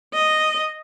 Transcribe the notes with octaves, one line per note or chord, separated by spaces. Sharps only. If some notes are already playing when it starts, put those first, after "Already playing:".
D#5